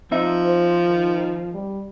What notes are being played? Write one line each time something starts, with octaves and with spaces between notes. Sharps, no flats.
F3 C4 D#4 E5
C5
D#3
G3